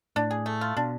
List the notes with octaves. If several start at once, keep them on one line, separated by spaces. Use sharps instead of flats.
A2 D4
G#4
A3
F4
B2 D4